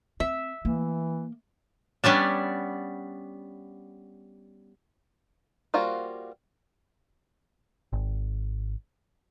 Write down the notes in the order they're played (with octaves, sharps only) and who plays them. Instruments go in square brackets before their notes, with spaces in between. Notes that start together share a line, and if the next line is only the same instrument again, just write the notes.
[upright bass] C4 [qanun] E5
[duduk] E3 [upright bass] A#3
[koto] G3 B3 C#4 D4
[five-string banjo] G3 A#3 F4 F#4 C5
[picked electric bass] G#1